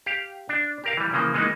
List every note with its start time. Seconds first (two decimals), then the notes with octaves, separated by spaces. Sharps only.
0.06 G4 F5
0.49 D4
0.84 G4 A#4 F5
0.97 E3 G3
1.13 C#3 E3 F3 A#3
1.34 E3 G#3 A#3 B3 D#4